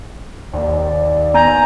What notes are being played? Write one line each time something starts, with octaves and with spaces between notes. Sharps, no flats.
D#2 D5
B3 G#5 A#5 G6